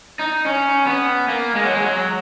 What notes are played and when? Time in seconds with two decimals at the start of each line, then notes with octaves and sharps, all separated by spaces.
0.19 D#4
0.46 C#4
0.87 B3
1.28 A#3
1.55 G#3
1.63 F#3
1.72 G#3
1.83 F#3